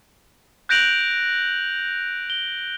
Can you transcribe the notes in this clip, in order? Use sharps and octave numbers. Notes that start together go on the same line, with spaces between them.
F#6 G6 A#6 D7 F7 F#7
G7